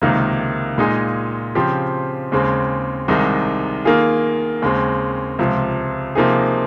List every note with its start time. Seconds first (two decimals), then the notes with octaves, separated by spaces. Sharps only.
0.02 C#2 C3 D#3 A#3 D#4
0.78 A#2 G#3 D#4 G#4
1.55 C#3 F3 C4 G4
2.32 D#2 C#3 G#3 C4
3.08 C2 C3 D#3 G#3 D#4
3.85 D#3 A#3 F4 G#4
4.62 D#2 C#3 G#3 C4
5.39 C#2 C3 F3
6.15 C3 F3 A#3 D#4 G#4